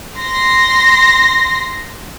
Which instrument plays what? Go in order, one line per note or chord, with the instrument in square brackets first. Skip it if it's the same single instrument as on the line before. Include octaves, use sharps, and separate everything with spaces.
[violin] C6 A#6